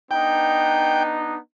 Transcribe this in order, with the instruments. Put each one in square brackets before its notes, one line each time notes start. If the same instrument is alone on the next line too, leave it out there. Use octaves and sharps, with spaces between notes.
[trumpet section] B3 D4 D#4 [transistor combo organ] G5